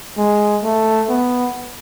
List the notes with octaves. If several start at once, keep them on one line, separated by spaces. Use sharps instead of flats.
G#3
A3
B3